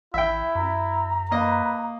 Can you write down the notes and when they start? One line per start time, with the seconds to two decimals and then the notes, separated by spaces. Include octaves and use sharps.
0.14 A1 E4 E5 G5
0.55 F#2 A#5
1.31 A#3 B4 D#5